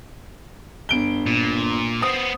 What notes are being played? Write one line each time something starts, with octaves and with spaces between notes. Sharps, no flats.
G1 D7 G7
A#2
B3 C4 C5 D#6